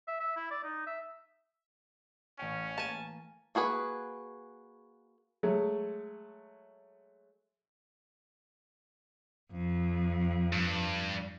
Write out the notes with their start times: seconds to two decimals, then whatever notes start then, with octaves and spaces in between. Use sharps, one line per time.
0.08 E5
0.20 E5
0.36 E4
0.51 D5
0.64 D#4
0.87 E5
2.39 A1 C#4 G5
2.78 A#3 G#5 A5
3.55 A#3 F#4 G#4 B4
5.43 F#3 G#3 A3
9.52 F2
10.53 G2